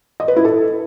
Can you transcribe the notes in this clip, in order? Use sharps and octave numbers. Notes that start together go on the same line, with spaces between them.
D#5
B4
E4
A4